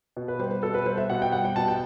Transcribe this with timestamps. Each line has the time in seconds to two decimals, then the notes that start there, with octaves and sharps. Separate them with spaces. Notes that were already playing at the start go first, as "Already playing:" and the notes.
0.17 B2
0.28 B4
0.39 G3 C5
0.51 B4
0.63 B2 A4
0.74 B4
0.86 G3 C5
0.98 E5
1.10 B2 F#5
1.22 G5
1.32 G3 F#5
1.45 G5
1.56 B2 A5
1.68 G5